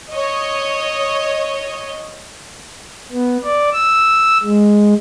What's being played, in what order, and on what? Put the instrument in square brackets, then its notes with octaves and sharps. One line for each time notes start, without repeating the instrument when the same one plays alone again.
[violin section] C#5 D#5
[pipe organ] B3
D5
E6
G#3